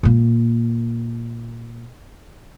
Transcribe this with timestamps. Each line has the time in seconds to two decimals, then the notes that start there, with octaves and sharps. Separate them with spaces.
0.03 A#2 A#3